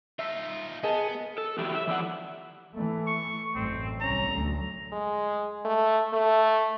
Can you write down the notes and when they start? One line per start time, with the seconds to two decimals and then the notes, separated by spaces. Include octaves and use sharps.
0.19 D#4 F4 E5
0.83 B3 G#4 A#4 D#5 A5
1.38 A4
1.58 E3 F#3 E4 G4
1.75 E5
1.87 E3 F3 D5 F#5
2.74 E3 A3
3.07 C#6
3.55 A1 F#2 C4
4.01 C2 C#4 A#5
4.31 D2 F#3
4.92 G#3
5.65 A3
6.13 A3